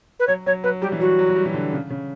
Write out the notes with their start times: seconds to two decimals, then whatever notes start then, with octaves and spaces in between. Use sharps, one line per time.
0.19 B4
0.27 F#3 C#5
0.46 F#3 C#5
0.63 F#3 B4
0.82 G3 G4
0.92 E3
1.00 F#3 F#4
1.19 F#3
1.30 F#3
1.36 G3
1.45 E3
1.54 D3
1.73 C#3
1.90 C#3